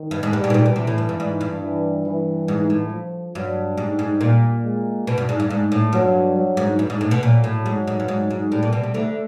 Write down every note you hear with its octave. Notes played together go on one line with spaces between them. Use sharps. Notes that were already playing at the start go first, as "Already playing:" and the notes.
Already playing: D#3
G2
G#2
G2 G3
G#2
B2
A#2
B2
C3 E3
A2
G2
G2
G#2
G2
E3
E3
G#2
A2
F3
G2 F#3
G#2 G3
G#2
A#2
G#3
B2
G2
G#2
G2
G#2
A2
G2 F#3
F#3
G#2
G2
G#2
A2
B2
A#2 F#3
A2
G#2 F#3
G#2
G2
G#2
G#2
A2 G3
A#2
B2
C3
D2 D3 A3